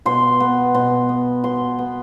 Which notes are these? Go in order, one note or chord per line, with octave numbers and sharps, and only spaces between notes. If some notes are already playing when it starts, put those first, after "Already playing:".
B2 C6
B3
B2 C6
B3
B2 C6
B3